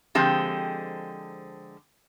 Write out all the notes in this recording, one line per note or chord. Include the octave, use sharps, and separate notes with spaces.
D3 F3 G#3 C4 G4